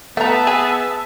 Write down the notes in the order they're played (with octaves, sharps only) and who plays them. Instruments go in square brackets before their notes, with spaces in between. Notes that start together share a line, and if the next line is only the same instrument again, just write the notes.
[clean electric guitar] A3 [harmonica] B3 [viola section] E5 A5 [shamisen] F#5 A#5
[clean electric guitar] G#4 [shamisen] G#5